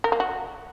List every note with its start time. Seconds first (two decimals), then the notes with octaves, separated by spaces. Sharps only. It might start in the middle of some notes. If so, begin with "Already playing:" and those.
0.04 A#4
0.12 A#3
0.20 F#4